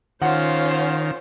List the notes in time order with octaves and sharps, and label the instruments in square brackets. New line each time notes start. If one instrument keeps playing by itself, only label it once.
[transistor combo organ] D#3 [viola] C#4 C5 [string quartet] F4 F5 [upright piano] F#5